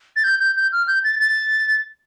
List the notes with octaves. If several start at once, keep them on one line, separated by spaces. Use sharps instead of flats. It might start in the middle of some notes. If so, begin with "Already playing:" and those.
A6
G6
G6
G6
F6
G6
A6
A6